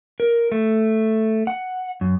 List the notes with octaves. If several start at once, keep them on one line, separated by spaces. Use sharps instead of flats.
A#4
A3
F#5
F#2